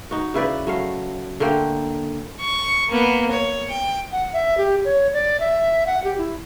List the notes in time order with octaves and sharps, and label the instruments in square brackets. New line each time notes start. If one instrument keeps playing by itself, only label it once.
[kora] D#4 F#4
C#3 E4 B4 D5
F#3 A3 F5
D3 A3 A#3 G5
[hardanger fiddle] C#6
A#3 B3
C#5
G5
[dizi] F#5
E5
G4
C#5
D5
E5
F#5
G4
E4